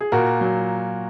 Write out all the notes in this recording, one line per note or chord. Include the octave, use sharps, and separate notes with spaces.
G#4
A#2 F#4 A#4
F#3